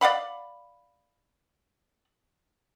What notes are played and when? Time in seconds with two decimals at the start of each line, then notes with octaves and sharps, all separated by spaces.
0.01 D5 F5 F#5 B5